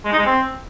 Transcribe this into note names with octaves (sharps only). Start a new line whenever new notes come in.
G#3
D#4
G#3
C4